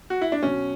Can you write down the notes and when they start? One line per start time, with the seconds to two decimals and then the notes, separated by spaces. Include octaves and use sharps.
0.10 F#4
0.21 E4
0.32 D4
0.43 B2 F#3 C#4